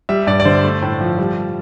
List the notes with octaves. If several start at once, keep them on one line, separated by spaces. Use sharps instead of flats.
G3 E5
G2 D5
D5
D3 C5
A3
A2
F3
G3